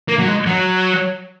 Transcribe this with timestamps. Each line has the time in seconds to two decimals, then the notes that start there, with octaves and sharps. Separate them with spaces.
0.09 A#3
0.19 F#3
0.28 G#3
0.47 F#3